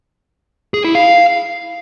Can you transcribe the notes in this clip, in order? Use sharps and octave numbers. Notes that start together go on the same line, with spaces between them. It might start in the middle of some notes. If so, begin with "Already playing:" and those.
G#4
E4
F5